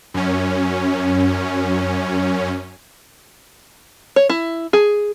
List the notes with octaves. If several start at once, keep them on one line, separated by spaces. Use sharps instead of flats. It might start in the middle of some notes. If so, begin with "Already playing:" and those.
F#2 C#4
C#5
E4
G#4